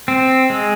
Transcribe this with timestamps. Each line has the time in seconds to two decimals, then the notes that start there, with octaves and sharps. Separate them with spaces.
0.08 C4
0.50 G#3